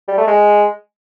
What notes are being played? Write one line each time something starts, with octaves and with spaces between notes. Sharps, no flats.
G3
A3
G#3